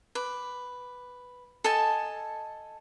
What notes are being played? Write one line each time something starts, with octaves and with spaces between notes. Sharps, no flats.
B4 D6
A4 D#5 G#5 A5